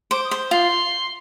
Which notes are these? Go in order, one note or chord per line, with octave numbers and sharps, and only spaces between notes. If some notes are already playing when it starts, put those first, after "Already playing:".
C5 D6
D#6
C5
F4 C6